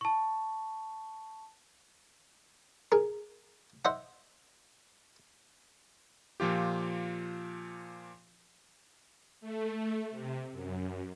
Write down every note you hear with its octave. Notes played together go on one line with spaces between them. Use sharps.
A5 C#6
G#4 A#4
C5 D#5 E5 F#5
A#2 F3 F4 G4
A3
C3
F#2